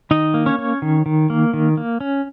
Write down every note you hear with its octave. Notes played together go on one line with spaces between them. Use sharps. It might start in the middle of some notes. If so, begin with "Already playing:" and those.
D#3 D#4 D#5
A#3
C#4 C#5
C#4
D#3
D#3
A#3
D#3
A#3
C#4